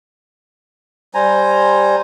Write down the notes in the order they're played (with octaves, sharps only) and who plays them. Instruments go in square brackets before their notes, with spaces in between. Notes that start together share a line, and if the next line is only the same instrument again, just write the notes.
[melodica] G3 C5 G#5 A#5